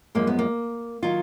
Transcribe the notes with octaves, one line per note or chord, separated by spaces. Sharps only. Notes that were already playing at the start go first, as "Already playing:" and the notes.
F#2 F3 G#3 A#3
B3
A#3
D#3 F#3 F4